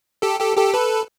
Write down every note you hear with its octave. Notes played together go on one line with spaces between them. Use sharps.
G4 A4
G4 A4
G4 A4
A4 B4